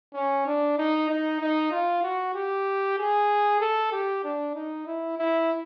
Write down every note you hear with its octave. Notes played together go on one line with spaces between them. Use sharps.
C#4
D4
D#4
D#4
D#4
F4
F#4
G4
G#4
A4
G4
D4
D#4
E4
E4